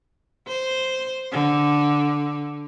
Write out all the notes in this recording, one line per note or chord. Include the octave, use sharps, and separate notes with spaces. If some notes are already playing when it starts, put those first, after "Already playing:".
C5
D3